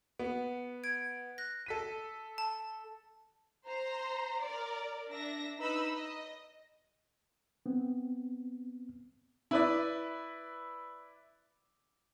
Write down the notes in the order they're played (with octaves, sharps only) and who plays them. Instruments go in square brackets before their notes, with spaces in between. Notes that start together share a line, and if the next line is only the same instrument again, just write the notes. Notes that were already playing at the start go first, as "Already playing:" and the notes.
[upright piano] B3
[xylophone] G#6 D7
F#6 A#6
[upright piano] A4 B6 D#7
[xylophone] A5
[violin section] C5 A#5 C6
A#4 D5
D4 E5 A#6
D#4 B4 D#5 B5 E6
D#5
[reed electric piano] B3 C4
[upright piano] E4 B4 D5